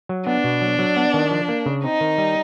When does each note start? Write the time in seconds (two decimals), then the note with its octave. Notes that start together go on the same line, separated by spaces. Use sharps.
0.09 F#3
0.26 B3 D4
0.44 B2
0.62 F#3
0.79 F#3
0.96 B3
1.14 D#3
1.31 F3
1.49 A#3
1.66 C#3
1.83 C4 D#4
2.01 D#3
2.18 G3